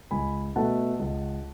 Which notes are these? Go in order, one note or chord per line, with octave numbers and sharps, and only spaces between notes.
C#2 G#5 B5
B2 A3 F#5 A5
C#2